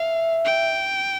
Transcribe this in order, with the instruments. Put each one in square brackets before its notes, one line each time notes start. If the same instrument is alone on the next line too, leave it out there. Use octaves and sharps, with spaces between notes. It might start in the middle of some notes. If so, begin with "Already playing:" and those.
Already playing: [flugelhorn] E5 [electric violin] F5
[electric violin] G5